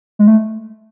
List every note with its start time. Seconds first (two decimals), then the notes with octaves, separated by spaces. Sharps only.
0.19 G#3
0.28 A3